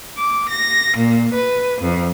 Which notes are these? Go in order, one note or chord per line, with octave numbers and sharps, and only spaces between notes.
D6
A#6
A#2
B4
F2